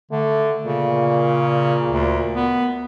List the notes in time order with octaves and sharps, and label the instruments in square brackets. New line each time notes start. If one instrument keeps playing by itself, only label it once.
[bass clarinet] D3 [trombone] A3
[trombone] A#2 [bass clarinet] C#3
[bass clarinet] D2
B3